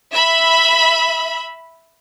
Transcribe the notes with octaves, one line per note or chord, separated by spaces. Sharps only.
E5 B5